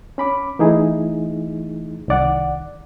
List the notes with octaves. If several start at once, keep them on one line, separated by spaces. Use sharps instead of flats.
C#4 B5 D6
E3 A3 D#4 E4 G#4
C2 D#3 D5 F#5